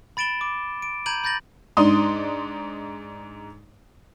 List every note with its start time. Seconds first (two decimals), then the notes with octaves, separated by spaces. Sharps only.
0.17 B5 A6 D7 E7 G7
0.41 D6
0.82 D7
1.06 A#5 B5 G6 G#6 D#7 F#7
1.24 B5 G6 A6 A#6 F#7
1.77 G#2 D4 D#4 C6 D#6